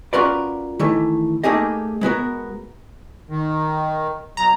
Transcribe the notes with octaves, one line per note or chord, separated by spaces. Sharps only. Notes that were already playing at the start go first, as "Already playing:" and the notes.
C#4 F4 F#4 A#4 B4 D5
D#3 E3 A3
A3 A#3 D#4 G4 G#4 D#5
G#3 B3 F#4 A#4
D#3
B2 F#3 A#5